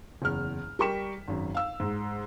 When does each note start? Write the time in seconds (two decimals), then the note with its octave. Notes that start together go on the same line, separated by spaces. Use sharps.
0.22 F#1 E2 F6
0.79 G3 A#4 G5 C#6 B6 E7
1.28 G#1 F#2
1.54 F5 E6
1.80 G#2